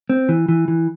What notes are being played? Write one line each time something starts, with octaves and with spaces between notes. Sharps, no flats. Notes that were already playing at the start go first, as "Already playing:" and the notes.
C4
E3
E3
E3